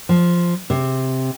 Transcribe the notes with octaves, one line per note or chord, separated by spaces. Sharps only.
F3
C3